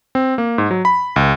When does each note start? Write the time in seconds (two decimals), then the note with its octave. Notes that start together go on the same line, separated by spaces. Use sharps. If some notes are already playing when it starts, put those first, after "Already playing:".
0.15 C4
0.38 A#3
0.58 G#2
0.71 F#3
0.85 B5
1.16 C#2